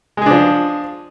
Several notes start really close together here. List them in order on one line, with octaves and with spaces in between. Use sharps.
G#3 G#4 D4 F3